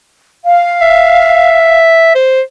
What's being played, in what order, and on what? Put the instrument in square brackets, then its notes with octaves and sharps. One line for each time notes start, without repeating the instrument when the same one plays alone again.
[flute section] F5
[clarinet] E5
C5